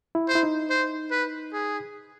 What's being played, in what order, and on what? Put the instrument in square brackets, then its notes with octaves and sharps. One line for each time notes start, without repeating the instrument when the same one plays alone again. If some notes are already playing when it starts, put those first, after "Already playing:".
[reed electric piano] E4
[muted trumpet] C5
[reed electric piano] E4
D#4
[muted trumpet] C5
B4
G#4